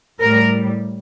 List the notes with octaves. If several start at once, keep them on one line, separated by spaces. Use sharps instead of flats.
A2 G3 A#4